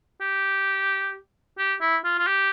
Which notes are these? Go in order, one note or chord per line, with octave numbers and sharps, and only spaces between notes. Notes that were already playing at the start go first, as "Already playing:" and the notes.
G4
G4
E4
F4
F4
G4